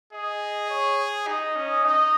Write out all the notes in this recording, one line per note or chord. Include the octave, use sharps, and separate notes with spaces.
G#4 D#5
C#5
D#4 D#5
C#4
D#4 D#5